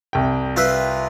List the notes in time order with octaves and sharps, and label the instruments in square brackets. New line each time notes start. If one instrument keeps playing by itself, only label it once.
[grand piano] C2 G5
[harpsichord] F4 B4 E5